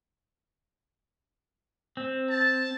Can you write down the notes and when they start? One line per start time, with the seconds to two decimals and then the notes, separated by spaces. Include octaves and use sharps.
1.97 C4
2.30 A5